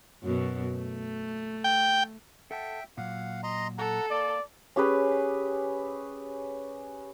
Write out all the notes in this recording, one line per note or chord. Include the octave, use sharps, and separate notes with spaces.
F#2 B2
A3
G5
A4 E5 F#5 G5 A5
A#2 F#3 F5 F#5
D#5 A#5 C6
A4 F#5 A#5
A#3 D5
C#4 G4 G#4 B4